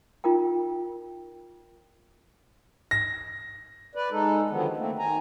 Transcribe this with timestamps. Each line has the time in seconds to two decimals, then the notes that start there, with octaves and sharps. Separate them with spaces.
0.24 D#4 F4 A#4 G5
2.91 A#6
3.95 B4 D5
4.11 G#3 D#4 A4
4.50 D3 D#3 F3 F#3 B3
4.77 A3 A#3 C4
4.99 D#3 G#5 A#5